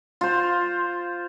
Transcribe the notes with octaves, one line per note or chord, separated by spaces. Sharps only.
F4 C5